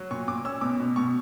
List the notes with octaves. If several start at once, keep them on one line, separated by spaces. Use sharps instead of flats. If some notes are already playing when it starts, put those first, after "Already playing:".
Already playing: F#3
A#2 C#6
A#2 D6
C#4 E6
B2 D6
B2
B2 C#6